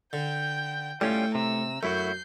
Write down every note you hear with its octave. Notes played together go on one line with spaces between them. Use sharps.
D3 G5 G6
A2 G3 C#4 F4 G5
C3 A#5 E6
F#2 A3 E4 F#4 G6 C7